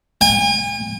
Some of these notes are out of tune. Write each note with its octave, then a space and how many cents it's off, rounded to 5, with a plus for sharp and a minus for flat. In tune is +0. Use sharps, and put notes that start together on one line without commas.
G#5 -40